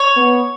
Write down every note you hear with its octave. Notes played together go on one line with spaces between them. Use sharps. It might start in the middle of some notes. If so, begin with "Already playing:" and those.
Already playing: C#5
B3